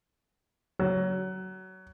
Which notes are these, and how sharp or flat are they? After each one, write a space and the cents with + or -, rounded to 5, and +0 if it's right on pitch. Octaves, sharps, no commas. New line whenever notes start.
F#3 +20